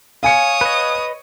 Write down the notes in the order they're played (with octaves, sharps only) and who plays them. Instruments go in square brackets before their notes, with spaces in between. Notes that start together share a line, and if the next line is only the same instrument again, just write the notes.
[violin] C#5 D#6 [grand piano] F5 G#5 C#7
[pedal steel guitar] B4 D#5